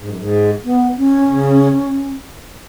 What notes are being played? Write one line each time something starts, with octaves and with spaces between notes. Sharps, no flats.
G#2
F#2
G#2
B3
C#4
C#3